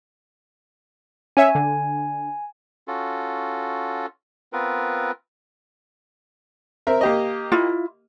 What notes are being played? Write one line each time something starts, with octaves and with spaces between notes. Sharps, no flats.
C#4 C#5 E5 G#5
D3
C#4 F4 F#4 A4
B3 C4 F4 A#4 B4
C4 A#4 E5
A#3 G4 D#5
E4 F4